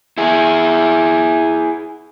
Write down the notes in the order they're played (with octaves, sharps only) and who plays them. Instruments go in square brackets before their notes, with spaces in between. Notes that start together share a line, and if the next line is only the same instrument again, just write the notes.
[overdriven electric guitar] E4 G#4